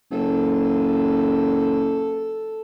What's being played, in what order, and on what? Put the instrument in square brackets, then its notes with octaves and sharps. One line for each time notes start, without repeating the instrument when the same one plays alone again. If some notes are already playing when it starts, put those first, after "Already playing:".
[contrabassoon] F#1 [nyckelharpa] A4